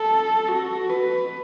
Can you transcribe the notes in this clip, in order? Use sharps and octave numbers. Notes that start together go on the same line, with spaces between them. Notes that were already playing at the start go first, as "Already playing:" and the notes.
Already playing: A4
F#4
B4